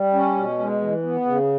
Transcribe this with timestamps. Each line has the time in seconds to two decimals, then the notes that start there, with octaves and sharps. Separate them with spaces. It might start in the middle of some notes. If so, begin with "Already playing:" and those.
Already playing: G3
0.13 C#4
0.36 B2
0.58 G#3
0.81 E3
1.03 B3
1.25 C#3